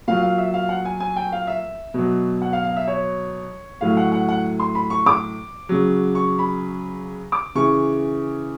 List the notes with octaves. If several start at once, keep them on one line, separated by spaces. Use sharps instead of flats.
A#2 F#3 F5
F5
E5
F5
F#5
G#5
G#5
G5
F5
E5
B2 F#3
F#5
F5
F5
E5
C#5
A2 F#3 F5
F#5
F#5
F#5
C6
B5
C#6
D6
C#3 F#3
C#6
B5
D6
C#3 E3 C#6